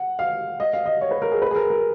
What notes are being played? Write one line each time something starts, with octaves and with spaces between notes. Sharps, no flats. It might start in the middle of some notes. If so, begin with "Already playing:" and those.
Already playing: F#5
F5
D#5
F5
D#5
C#5
B4
A#4
G#4
B4
G#4
A#4
A#4